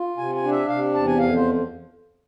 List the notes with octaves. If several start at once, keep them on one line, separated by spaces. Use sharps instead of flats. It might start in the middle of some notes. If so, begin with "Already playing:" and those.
Already playing: F4
C3 G#5
G#5
D4
E5
C3 F5
E2 A5
G#5
F2 F5
C5